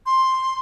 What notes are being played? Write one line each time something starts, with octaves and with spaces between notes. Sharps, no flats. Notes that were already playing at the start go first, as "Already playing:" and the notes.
C6